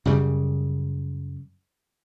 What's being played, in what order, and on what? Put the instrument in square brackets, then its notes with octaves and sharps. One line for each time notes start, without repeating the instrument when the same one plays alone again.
[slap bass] F#2 C#3 G3